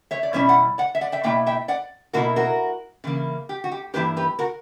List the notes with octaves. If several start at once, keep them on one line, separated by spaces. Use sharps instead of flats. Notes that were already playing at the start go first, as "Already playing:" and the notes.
C#5 E5
D5
B2 G3 C#4 E4 C#5 E5
D5 F#5
D5 F#5
E5
D5 F#5
E5 G5
B2 A#3 E4 E5 G5
E5 G5
D5 F#5
B2 A#3 E4 F#4 A#4
F#4 A#4
C#3 E3 A#3
G4
F#4
G4
G2 E3 A#3 E4 G4 B4
G4 B4
F#4 A#4